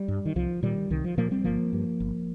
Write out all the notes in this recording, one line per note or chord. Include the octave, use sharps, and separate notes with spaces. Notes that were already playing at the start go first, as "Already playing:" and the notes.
Already playing: G3
G2
D#3
C2 F3
A#2 D#3 G3
C2 D#3
F3
A#2 F3 A#3
G3 C4
G1 F3 A#3
G2
G1